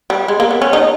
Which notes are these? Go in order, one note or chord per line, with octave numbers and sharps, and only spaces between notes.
G3
G#3
A#3
B3
C#4
D#4